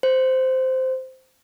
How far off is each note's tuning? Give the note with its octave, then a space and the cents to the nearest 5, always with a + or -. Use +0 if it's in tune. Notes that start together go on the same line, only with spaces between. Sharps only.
C5 -10